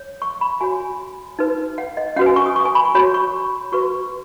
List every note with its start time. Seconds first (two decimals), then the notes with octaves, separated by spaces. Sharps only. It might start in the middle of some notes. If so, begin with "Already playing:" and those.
Already playing: C#5
0.22 C#6
0.41 B5
0.61 F#4 C#5 G#5
1.39 D#4 B4
1.78 F#5
1.97 D#5
2.16 C#4 F#4 B4 F#5
2.26 G#5
2.36 C#6
2.46 D#6
2.56 C#6
2.65 G#5
2.75 B5
2.85 C#6
2.94 F#4 C#5 B5
3.14 C#6
3.72 F#4 B4 C#6